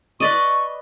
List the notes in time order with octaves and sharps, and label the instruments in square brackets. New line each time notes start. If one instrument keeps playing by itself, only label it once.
[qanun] B4 D5 D#5 [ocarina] C#6